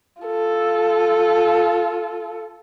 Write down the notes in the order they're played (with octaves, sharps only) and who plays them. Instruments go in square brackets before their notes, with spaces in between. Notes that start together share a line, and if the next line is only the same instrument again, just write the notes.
[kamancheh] F4 A4